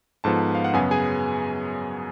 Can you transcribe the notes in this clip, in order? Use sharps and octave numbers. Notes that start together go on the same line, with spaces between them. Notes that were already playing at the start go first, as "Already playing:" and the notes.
G#2 F3 B3 A4 A5
F5
F#5
F#2 C#3 F#3 B3 G#4 G#5
G#4 G#5